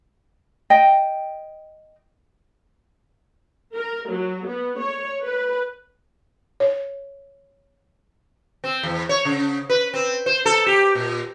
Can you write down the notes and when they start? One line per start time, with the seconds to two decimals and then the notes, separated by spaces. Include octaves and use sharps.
0.70 D#5 G5
3.75 A#4
4.09 F#3
4.46 B3
4.78 C#5
5.23 B4
6.60 C#5
8.64 C4
8.83 E2
9.09 C#5
9.25 C#3
9.69 B4
9.94 C4
10.26 C5
10.45 A4
10.66 G4
10.95 A#2